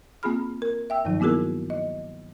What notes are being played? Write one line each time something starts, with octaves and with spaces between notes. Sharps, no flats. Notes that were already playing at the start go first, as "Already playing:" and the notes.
A#3 C4 F4 G#4 B5 F6
A#4
E5 G5 E6
G2 D#3 F3 F#3 D#4
A#3 B3 E4 F#4 G#4 A#4
D#5